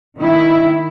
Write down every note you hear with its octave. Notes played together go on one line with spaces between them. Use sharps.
D#3 E4